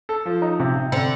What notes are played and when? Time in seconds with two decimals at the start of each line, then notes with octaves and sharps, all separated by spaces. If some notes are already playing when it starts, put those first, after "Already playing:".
0.09 A4
0.25 F3
0.42 D#4
0.60 C3
0.75 C3
0.92 D3 C4